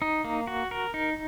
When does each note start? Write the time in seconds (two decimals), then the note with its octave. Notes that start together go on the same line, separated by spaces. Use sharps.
0.02 D#4
0.25 A#3
0.47 F#4
0.71 A#4
0.94 D#4